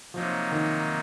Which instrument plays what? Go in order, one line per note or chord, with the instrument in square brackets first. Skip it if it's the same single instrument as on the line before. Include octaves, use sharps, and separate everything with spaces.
[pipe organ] C3 F#3 A#3 D#4 [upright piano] F3
[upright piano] D#3